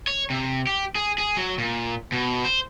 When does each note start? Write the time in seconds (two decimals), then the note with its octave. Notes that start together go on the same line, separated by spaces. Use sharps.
0.07 C#5
0.30 C3
0.67 G4
0.95 G#4
1.18 G#4
1.37 F#3
1.58 A#2
2.12 B2
2.45 C5